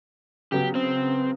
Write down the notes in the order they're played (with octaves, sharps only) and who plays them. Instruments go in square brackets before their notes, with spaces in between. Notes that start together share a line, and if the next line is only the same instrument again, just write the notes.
[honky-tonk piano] C#3 F#3 B3 [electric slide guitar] G4
[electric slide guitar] C4